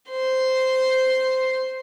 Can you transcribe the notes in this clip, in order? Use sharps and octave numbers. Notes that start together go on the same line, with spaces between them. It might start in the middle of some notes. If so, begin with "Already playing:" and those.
C5 C6